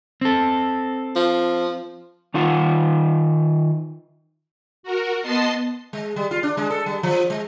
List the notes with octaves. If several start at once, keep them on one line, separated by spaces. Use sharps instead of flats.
C4 A4
F3
D#3 D#4 F4 F5 F#5
F#4 A#4
B3 D#5 A5 C6 C7
G#3
G3
F4
D4
G#3
A4
G3
F3
G#3